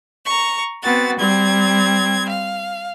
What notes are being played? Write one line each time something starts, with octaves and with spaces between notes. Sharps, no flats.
A#5 C#6
B3 C4 F#4 A6
G3 C4 G#6
F5